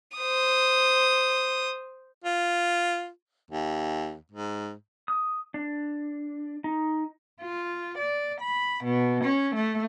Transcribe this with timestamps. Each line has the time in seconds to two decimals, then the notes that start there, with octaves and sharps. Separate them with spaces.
0.17 C5 D#6
2.24 F4
3.51 D#2
4.32 G#2
5.08 D#6
5.54 D4
6.64 D#4
7.42 F4
7.98 D5
8.40 B5
8.84 B2
9.24 C#4
9.55 A3